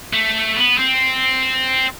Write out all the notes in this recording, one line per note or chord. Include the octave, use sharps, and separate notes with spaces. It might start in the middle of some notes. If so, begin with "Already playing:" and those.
A3
B3
C4